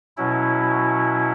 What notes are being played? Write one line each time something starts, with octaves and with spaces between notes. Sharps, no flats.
B2 F#3 C#4 E4